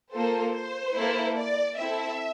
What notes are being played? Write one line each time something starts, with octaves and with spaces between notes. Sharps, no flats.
A#3 F4 A4 C5
C5
A#3 E4 A4
D5
C4 E4 A4 E5